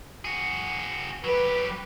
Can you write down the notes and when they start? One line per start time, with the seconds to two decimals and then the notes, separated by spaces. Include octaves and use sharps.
0.25 F#4 G#4
1.24 F#3 G4 B4